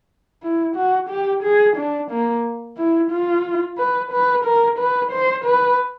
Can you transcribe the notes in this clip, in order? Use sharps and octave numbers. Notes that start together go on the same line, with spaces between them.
E4
F#4
G4
G#4
D4
A#3
E4
F4
B4
B4
A#4
B4
C5
B4